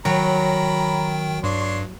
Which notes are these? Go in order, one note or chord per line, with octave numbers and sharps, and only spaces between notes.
D#3 F#3 G5 A#5 B5
G2 D4 C#5 C6